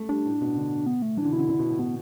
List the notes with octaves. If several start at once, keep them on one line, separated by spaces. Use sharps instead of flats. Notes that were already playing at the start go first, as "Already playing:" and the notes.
Already playing: A3
G3 D4
A2
B2
D3
B3
A3
E3 D4
D3
B2 E4
D3
D3
B2
A2
B2 B3